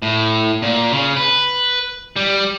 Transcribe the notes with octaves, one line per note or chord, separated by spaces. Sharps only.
A2
A#2
C#3
B4
G3